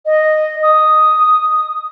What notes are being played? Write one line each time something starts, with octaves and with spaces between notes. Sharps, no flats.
D#5
D#6